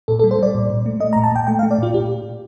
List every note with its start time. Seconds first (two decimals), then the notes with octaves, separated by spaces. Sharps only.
0.08 A#2 A4
0.19 A4
0.24 G3
0.31 C5
0.39 G3 D5
0.55 A#2
0.70 A#2
0.86 A3
1.00 A3 D#5
1.13 A#5
1.16 A#2
1.24 A5
1.32 A#2 G5
1.47 A3 G5
1.59 F5
1.63 A3
1.71 D5
1.78 A#2 F4
1.94 A#2 G4